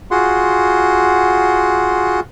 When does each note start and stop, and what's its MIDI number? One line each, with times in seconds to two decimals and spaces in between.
0.11 2.20 65
0.11 2.20 66
0.11 2.20 68
0.11 2.20 78
0.11 2.20 84